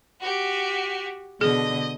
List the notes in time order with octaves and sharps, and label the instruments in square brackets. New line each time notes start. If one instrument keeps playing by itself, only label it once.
[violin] F#4 G4
[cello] B2 D3 [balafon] G#4 [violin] D#5